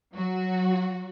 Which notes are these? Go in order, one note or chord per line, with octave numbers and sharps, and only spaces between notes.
F#3 F#4